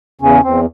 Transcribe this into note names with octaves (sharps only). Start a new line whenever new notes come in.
E2 C#3 C#4
E2 C4